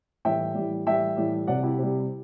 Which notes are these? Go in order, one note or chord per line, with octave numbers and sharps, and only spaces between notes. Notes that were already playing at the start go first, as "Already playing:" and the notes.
A2 E3 G3 E5 G5
A2 E3 G3
A2 E3 G3 E5 G5
A2 E3 G3
C3 G3 D5 F#5
E4 G4
C3 G3